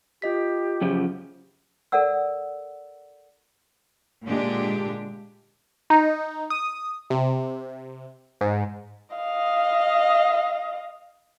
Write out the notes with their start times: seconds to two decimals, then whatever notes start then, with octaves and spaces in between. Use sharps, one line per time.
0.22 F4 G4 D#5 B6
0.81 F#2 C#3 F3
1.92 A4 A#4 D5 F#5 E6
4.26 A#2 D3 G#3 D4 G4
5.90 D#4
6.50 D#6
7.10 C3
8.41 G#2
9.16 D#5 F5